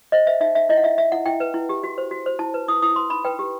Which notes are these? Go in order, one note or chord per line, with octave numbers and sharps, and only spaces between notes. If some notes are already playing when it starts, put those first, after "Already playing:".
C5 D#5
C5 E5
D#4 E5
D#4 E5
E4 D#5
F#5
E4 E5
E4 E5
E4 F#5
E4 G5
B4
E4
G4
F#4
C5
F#4
C5
E4 A5
B4
E4 D#6
E4 D#6
B4 C6
D#4 B5
B4 G5
G4